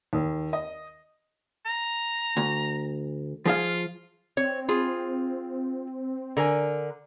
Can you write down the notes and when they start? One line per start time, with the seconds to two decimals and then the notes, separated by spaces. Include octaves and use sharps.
0.13 D#2
0.53 D#5
1.66 A#5
2.37 D2
3.46 F3 F4 G#4 F5
4.37 C4 C#5
4.69 F4 G#4
6.37 D3 A#4 G#5